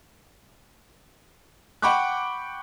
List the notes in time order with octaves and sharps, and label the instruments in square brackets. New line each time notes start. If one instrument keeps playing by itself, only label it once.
[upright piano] F#5 G5 B5 C#6 D6 F#6